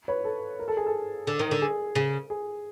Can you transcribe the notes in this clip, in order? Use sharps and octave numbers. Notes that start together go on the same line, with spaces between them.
B4 C#5
A4
A#4
A4
G#4
A4
D3
D#3
D3
G#4
C#3
G#4